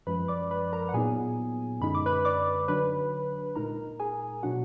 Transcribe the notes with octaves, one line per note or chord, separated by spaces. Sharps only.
F#2 F3 G#3 B4 B5
D5 D6
B4 B5
A#4 A#5
F#5
A#2 F#3 B3 D#4 G#4 G#5
F#2 D3 G#3 D#4 B5
D6
B4 B5
D5 D6
D3 F#3 D4 B4 B5
A#2 G#3 D#4 A#4 A#5
G#4 G#5
B2 F#3 D4 F#4 F#5